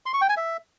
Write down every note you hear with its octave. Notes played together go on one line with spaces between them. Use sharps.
C6
C#6
G5
G#5
E5